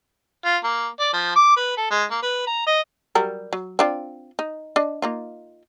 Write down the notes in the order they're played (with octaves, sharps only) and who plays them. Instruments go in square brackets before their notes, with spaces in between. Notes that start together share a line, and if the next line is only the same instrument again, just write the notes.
[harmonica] F4
A#3
D5
F3
D6
B4
A4
G#3
A#3
B4
A#5
D#5
[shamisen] F#3 G3 A#4
F#3
C4 D4 F4
D#4
D4 D#5
A#3 D#4 F4